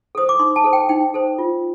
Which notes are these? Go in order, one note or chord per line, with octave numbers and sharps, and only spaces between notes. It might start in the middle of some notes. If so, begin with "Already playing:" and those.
A4 C5 D#6
D6
D#4 C6
A5
A4 C5
G5
D#4 G5
A4 C5
F4